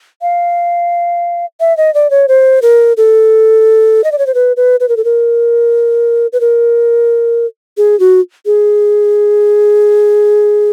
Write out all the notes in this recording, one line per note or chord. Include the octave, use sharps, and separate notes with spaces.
F5
E5
D#5
D5
C#5
C5
A#4
A4
D#5
D5
C#5
C5
B4
B4
B4
A#4
A4
A#4
B4
A#4
G#4
F#4
G#4